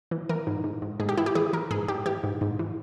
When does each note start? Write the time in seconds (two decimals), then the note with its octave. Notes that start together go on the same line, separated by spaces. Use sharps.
0.11 E3
0.29 E3 A#4
0.47 G#2
0.64 G#2
0.82 G#2
1.00 G#2 G#4
1.09 G4
1.17 E3 E4
1.26 G4
1.35 E3 G#4
1.53 E3 A#4
1.71 G#2 G#4
1.88 G#2 G4
2.06 E3 G4
2.24 G#2
2.41 G#2
2.59 E3